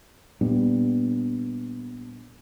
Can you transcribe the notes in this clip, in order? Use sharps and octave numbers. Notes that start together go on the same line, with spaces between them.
A#2 G3 B3 D4